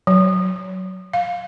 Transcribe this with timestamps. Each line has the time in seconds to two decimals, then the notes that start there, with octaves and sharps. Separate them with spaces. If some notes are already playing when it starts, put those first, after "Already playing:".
0.07 F#3
1.13 F5